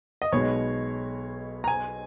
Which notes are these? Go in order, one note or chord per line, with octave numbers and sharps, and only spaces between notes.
D#5
B1 B2 G#3 C#5
A#5
G#5